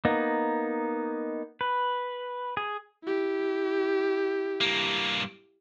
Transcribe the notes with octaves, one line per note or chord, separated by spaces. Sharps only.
A#3 B3 D#4
B4
G#4
E4 G4
G2 A#3